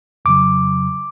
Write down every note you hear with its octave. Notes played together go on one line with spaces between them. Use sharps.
F2 C#3 F#3 D6